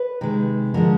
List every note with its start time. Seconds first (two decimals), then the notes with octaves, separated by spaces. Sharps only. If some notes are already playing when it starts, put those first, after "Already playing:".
Already playing: B4
0.21 C3 D#3 G#3
0.74 D3 F3 G#3 A#4